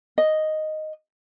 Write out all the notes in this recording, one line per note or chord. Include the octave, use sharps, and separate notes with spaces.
D#5